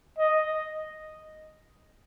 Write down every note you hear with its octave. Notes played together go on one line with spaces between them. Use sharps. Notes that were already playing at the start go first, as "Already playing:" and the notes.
D#5